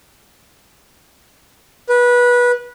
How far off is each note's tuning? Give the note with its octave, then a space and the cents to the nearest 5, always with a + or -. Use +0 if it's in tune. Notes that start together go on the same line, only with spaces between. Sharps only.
B4 -20